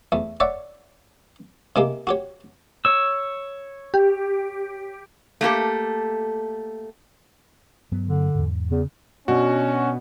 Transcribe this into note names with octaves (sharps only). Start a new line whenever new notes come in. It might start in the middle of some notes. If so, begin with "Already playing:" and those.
E2 A3
C#5 D5 E5 F#5 C#6
C3 G#3 A#3 G4
F#4 G4 C#5
C#5 E6
G4
A3 A#3 G4 A4
G2 F#3 B3
D3
E2 G#2
E2 C#3
B2 C#4 D4 F#4